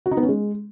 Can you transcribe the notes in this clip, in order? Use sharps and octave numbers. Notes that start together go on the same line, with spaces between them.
F#4
D#4
B3
C#4
G#3